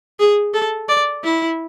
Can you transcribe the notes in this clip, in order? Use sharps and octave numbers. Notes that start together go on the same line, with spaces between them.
G#4
A4
D5
E4